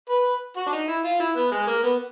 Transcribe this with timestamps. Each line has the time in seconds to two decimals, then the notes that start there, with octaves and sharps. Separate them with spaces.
0.09 B4
0.57 F#4
0.67 D4
0.73 D#4
0.88 E4
1.04 F4
1.20 E4
1.36 B3
1.52 G#3
1.67 A#3
1.83 B3